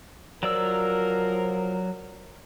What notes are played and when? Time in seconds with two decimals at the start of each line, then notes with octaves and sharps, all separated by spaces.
0.43 F3 F#3 A#4 D5 E6